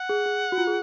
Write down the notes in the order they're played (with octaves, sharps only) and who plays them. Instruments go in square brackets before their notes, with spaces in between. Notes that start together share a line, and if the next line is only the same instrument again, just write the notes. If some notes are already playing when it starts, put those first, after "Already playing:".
Already playing: [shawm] F#5
[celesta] G#4
G#4
F#4
F4
G#4